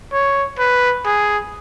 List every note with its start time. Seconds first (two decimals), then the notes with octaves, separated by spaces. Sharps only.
0.13 C#5
0.59 B4
1.06 G#4